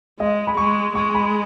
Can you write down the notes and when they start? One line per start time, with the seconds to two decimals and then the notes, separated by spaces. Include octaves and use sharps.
0.20 G#3 D#5
0.47 B5
0.57 G#3 C#6
0.95 G#3 C#6
1.15 B5